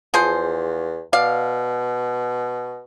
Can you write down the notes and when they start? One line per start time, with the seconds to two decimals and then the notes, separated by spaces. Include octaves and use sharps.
0.14 E2 F3 G#4 C5
1.13 B2 D5 F5